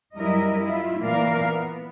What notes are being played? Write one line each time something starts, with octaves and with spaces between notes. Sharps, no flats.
F#2 G3 E4 A#4 D#5
E4 F4
A#2 E3 A#3 A#4 D5 F5
B3